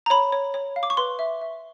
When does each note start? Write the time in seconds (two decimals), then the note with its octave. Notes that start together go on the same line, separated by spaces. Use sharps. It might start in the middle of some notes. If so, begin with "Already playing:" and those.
0.06 A#5
0.10 C#5 B5
0.32 C#5
0.54 C#5
0.76 F5
0.83 D6
0.90 C#6
0.97 B4 C6
1.19 E5
1.42 E5